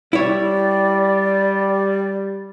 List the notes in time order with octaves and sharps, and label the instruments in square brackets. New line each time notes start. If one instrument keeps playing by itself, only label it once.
[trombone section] G3 [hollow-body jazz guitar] E4 C#5 [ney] D5